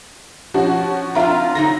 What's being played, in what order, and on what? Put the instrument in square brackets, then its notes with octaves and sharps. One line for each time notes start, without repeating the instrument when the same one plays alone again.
[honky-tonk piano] F3 C#4 F#4
[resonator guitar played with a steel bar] C4 D4 F5 [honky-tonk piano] F4 E5 A#5
[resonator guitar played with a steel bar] D3 F#3 D#4 [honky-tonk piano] A#6